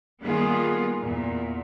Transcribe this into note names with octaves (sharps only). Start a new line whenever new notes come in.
D#3 G3 A#3 B3 F4 G#4
E2 A#2